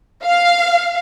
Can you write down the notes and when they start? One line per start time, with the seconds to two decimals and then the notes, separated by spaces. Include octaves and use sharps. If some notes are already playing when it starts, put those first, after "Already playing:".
0.24 F5